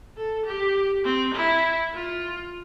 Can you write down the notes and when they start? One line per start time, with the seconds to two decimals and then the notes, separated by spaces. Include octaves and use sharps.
0.17 A4
0.45 G4
1.04 C4
1.34 E4
1.94 F4